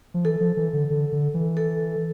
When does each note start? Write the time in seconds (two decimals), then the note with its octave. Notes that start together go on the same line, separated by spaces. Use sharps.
0.14 F3
0.25 E3 A4
0.41 F3
0.57 E3
0.73 D3
0.90 D3
1.12 D3
1.34 E3
1.57 A4